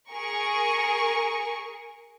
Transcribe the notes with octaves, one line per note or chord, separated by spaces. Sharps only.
G#4 A#4 C#6